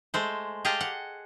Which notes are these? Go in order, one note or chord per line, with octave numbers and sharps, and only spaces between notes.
G#3 A3 C5
G4 G#4 D#5 F5 A5
F#5